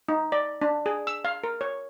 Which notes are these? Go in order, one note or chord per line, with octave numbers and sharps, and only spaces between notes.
D#4
D5
D4
G#4
E6
F5
A#4
C#5